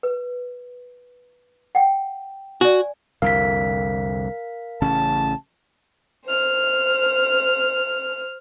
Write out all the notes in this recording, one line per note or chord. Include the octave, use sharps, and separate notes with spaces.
B4
F#5 G5
F#4 D5 G#5
C2 F2 D3 A#4 F5 B6
A1 C#3 C#4 A5
C5 F6